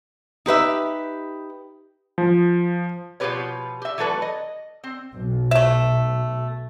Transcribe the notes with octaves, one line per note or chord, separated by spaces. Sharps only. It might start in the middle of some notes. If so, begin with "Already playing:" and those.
D#4 G4 B4 E5
F3
B2 F3 F4 G4 B4 C#5
G4 E5
E3 F#3 A3 A4 B4
D#5
C4
B1
A3 E5